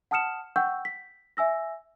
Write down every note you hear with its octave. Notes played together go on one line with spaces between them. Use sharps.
F#5 A5 D#6 F6 C#7 E7
F#5 G5 C#6 E6 G6
B6
E5 G#5 E6 A#6